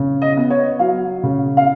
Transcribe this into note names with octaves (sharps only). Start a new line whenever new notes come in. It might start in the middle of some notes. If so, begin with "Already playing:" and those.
Already playing: C#3
D#5
B3
C#5
F#3 F5
C#3
F5